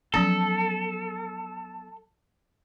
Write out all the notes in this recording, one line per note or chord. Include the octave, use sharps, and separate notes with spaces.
F3 F#3 B3 C#4 A4